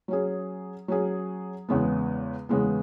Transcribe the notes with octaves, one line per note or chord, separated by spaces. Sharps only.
F#3 C#4 G#4
F#3 C#4 G#4
E2 C#3 G#3 B3
E2 C#3 G#3 B3